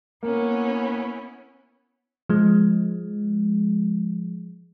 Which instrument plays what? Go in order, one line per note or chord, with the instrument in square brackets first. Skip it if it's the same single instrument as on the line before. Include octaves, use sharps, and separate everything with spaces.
[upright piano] A#3 [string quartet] B3 C#4 E4
[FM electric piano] F3 G#3